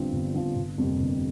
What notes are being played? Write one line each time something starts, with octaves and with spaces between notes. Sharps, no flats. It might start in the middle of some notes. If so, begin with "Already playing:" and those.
Already playing: G1 G2 F3 C4
G1
G2 F3 C4
G1
F2 C3 G3 A#3
G1